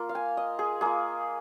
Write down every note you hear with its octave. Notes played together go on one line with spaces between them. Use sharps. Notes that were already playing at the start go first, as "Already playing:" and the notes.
Already playing: A#3 F4
F5
G#5
D#5
G#4
A#3 F4 G#4